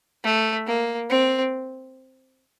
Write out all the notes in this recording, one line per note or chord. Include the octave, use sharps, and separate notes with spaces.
A3
A#3
C4